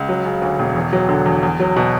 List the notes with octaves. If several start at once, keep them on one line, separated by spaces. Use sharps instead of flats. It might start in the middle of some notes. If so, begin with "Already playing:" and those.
Already playing: C#2
F#3
C#3
D2
E1
E2
F#3
D3
E2
E2
F#3
B2